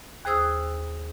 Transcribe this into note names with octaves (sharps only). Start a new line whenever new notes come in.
D#2 G#4 C5 D#6 E6